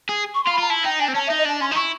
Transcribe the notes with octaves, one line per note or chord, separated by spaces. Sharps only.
G#4
C#6
F4 C6
B5
F4 A#5
E4 A5
D#4 G5
D4 G#5
C4
C#4 A5
E5
D#4
D#5
D4 A5
C#4 C6
D#4
E4 C#6